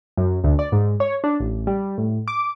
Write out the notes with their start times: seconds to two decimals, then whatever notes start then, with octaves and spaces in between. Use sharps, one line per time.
0.17 F#2
0.44 D2
0.59 D5
0.72 G#2
1.00 C#5
1.24 D4
1.40 A1
1.67 G3
1.98 A2
2.28 D6